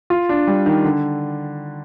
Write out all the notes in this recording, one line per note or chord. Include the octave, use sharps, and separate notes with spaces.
F4
D4
G3
D#3
D3